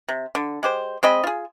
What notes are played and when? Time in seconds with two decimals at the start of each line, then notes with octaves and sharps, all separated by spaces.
0.08 C3
0.35 D3
0.63 G#3 G4 C5
1.03 G#3 C4 D#5 B5
1.24 F4 G#4